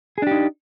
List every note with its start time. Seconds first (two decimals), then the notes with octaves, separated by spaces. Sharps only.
0.18 G#4
0.22 D4
0.27 G4
0.31 D#4